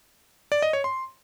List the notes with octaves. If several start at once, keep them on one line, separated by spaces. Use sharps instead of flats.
D5
D#5
C#5
C6